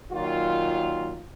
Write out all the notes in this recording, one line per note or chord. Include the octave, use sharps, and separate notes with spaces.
A#2 D#3 F#3 F4